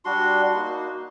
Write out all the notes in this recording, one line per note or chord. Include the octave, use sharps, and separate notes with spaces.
G3 D4 F#4 C6
A#3 D#4 F#4